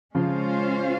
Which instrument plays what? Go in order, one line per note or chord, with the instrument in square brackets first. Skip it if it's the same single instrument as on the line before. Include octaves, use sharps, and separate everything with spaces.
[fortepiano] C#3 F3 [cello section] G#3 C#4 F4 C5 F5